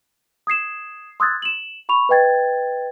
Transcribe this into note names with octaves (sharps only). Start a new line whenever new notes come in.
D#6 G#6 C7 E7
C6 D#6 E6 F#6 G#6 A6
E7 F#7
B5 C#6 F7
B4 D#5 G5 G#6 A6